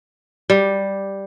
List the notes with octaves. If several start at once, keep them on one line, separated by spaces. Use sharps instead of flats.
G3